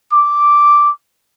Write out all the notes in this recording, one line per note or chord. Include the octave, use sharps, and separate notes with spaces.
D6